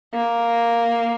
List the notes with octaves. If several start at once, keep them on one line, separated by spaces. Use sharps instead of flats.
A#3